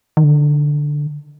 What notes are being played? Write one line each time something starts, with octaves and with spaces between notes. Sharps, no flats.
D#3
D3